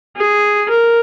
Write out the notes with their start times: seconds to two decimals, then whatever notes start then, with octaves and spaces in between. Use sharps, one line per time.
0.16 G#4
0.69 A#4